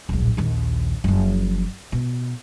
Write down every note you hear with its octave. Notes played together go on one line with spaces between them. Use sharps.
D1 A#1
A#1 D#2
F#1 F3
B2